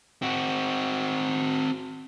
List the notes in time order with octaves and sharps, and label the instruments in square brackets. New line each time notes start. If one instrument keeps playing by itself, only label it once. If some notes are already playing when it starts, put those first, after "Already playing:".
[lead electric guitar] C4 F#4